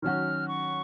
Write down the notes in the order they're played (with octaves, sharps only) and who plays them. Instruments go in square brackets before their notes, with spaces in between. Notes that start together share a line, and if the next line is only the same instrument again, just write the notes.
[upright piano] D#3 F#3 C#4 F#4 [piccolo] F6
[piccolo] C#6